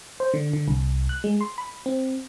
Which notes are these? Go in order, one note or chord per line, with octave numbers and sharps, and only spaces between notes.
C5
D3
D3
C2
F#6
G#3
C6
B5
C4